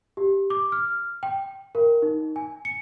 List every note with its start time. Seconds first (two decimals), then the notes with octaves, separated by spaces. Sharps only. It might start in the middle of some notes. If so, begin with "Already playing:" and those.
0.17 G4
0.50 D6
0.72 F6
1.23 G5
1.75 A#4
2.02 D#4
2.36 G#5
2.65 C#7